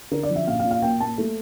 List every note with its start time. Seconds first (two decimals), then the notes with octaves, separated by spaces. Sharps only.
0.11 D3 A#4
0.23 D5
0.29 F3
0.35 E5
0.47 A#1 F5
0.59 F5
0.65 A#2
0.71 F5
0.82 A#3 G5
1.00 A#3 A5
1.18 A3